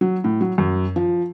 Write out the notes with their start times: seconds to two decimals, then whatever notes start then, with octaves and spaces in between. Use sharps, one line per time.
0.01 F#3
0.24 A2
0.41 F#3
0.58 F#2
0.96 F3